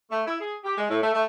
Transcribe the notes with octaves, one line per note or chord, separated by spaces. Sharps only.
A3
E4
G#4
G4
G#3
A2
A3
A3